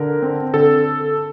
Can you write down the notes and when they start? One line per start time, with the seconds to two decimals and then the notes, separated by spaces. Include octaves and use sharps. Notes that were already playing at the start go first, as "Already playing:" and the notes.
Already playing: D3 A#4
0.22 C4
0.54 D3 A4